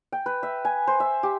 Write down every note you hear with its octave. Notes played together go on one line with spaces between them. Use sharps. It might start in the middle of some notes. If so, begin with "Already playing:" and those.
G5
B4
E5
G#5
C5
E5
G4